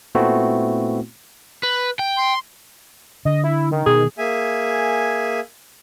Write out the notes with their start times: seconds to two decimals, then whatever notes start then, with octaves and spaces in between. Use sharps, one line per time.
0.15 A#2 A3 B3 C4 E4 F#4
1.63 B4
1.99 G5
2.17 C6
3.25 D3 D#5
3.44 E4
3.71 D#3
3.86 B2 G#4
4.18 A#3 G#4 E5 G#5